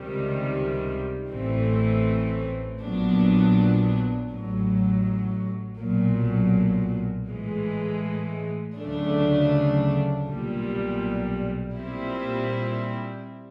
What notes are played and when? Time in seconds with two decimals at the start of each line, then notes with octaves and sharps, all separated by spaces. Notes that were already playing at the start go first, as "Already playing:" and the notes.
Already playing: C#2 C3 D#3 G3
1.31 A1 A2 E3 A3 C4
2.80 A#1 A#2 F#3 B3 D4
4.29 A1 A2 F#3
5.78 B1 A#2 F#3
7.28 A2 E3 G#3
8.78 D2 C#3 F#3 A3 D4
10.27 B1 A#2 G3
11.76 A#2 G3 C4 E4